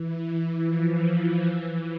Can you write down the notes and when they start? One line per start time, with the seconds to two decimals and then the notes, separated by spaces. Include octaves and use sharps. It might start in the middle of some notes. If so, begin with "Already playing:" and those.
Already playing: E3
0.64 F3
1.44 E3